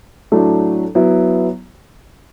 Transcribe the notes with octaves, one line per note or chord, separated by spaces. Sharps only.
A2 F#3 A3 D4
F#3 B3 E4